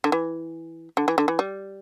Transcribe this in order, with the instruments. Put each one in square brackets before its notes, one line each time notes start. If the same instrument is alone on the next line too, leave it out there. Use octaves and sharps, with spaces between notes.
[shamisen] D3
E3
D3
E3
D3
E3
G3